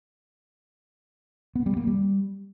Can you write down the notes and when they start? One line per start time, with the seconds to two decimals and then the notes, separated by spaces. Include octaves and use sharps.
1.55 B3
1.66 G3
1.77 A#3
1.87 G3